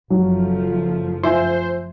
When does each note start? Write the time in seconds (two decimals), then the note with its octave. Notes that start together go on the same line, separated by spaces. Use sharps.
0.10 F#1 F3 F#3 A3
1.23 F4 C5 E5 G#5